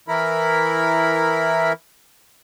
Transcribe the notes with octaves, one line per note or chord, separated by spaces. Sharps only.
E3 E4 A#4 B5